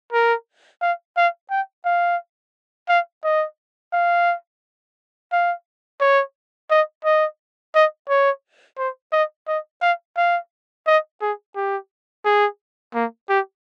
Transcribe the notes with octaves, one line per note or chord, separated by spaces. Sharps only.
A#4
F5
F5
G5
F5
F5
D#5
F5
F5
C#5
D#5
D#5
D#5
C#5
C5
D#5
D#5
F5
F5
D#5
G#4
G4
G#4
A#3
G4